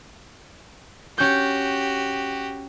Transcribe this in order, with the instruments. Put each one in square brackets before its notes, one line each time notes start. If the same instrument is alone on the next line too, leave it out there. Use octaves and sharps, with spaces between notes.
[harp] C#4 G6 [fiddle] F#4 G4